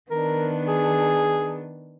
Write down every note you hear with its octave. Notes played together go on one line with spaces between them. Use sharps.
D#3 B3 D4 A#4
G#4